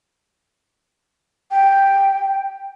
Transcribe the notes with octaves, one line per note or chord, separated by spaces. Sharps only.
G5